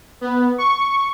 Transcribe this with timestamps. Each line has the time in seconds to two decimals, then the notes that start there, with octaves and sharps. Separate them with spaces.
0.21 B3
0.58 C#6